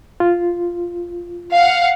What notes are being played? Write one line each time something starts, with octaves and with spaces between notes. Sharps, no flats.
F4
F5 F#5